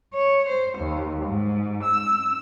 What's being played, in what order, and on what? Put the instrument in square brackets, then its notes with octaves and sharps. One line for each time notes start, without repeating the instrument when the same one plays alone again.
[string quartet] C#5
C5
D#2
G#2
E6